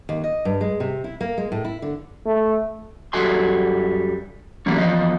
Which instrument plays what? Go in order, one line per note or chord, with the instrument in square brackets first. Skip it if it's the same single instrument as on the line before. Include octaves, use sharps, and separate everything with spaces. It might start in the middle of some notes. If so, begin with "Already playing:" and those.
[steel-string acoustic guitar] D#2
D#5
G2
G#3
C3
E4
A#3
G#3
A2
E4
D3
[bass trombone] A3
[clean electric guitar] F#2 G3 F#4 A4 G#5 C6
E3 F#3 G3 A3 A#3 C#4
E2 F3 D#5